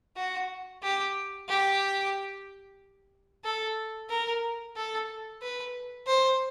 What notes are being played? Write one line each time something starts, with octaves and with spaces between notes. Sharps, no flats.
F#4
G4
G4
A4
A#4
A4
B4
C5